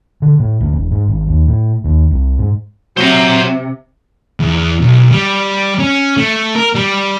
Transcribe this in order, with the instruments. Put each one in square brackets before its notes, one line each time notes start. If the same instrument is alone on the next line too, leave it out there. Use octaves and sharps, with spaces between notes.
[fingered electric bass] D3
A2
D2
E1
G#2
G#1
D#2
A2
D#2
C2
G#2
[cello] C3 [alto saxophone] F#3 [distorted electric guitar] C5 A#5
[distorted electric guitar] E2
B1
G3
C#4
A3
A#4
G3